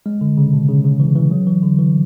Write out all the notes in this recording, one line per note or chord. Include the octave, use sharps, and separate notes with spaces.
G#3
D3
C#3
B2
C#3
C#3
E3
E3
F#3
E3
D3
E3